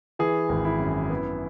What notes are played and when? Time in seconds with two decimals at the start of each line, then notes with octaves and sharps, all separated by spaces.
0.19 E3 G#4
0.49 G#1
0.65 E4
0.80 F#2
1.10 B3